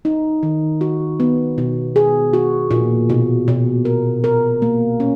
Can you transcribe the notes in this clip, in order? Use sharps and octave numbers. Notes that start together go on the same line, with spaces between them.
D#4
D#3
F#4
B3
B2
G#4
F#4
A#2
B2
B2
A#4
A#4
A#3
C#4